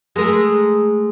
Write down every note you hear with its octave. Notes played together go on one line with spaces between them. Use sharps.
G#3 A3 A#4